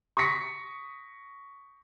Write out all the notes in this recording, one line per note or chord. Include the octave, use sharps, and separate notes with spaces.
C#6 D#6 A#6 B6 C#7